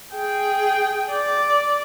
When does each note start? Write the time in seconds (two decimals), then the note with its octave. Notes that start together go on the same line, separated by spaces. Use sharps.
0.14 G#4 G5
1.13 D5